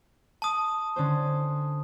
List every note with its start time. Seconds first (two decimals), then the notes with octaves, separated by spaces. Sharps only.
0.42 A5 D#6
0.96 D3 C#4 C5